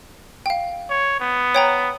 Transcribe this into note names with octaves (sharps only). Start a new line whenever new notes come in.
F5 G5
C#5
B3
C#5 G5 A#5